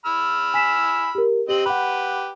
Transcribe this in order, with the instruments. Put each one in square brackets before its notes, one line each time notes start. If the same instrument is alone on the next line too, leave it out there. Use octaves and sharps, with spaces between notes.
[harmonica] B5 E6 F6
[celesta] G#5 B6 E7
G4 A#4
[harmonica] C4 D#5 [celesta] G4 F#7
[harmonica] G4 B4 [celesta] F#5 B5